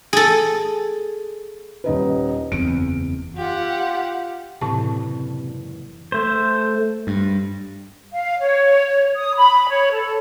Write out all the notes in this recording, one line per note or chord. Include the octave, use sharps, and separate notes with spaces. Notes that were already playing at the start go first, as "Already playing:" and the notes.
G#4 A4
D#1 D#4 B4
F#1 E2 C4 D7
F4 G4 F#5
F#1 A2 C3 E3 A5
A3 C5
G2
F5
C#5
D#6
B5
C#5
A4